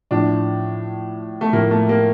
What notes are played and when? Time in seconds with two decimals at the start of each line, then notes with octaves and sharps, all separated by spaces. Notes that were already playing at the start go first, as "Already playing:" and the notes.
0.11 A2 F3 D4
1.41 A3
1.53 A2 F3 A#3
1.71 A3
1.89 A#3